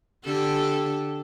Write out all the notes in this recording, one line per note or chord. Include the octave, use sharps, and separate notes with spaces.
D3 G4 A4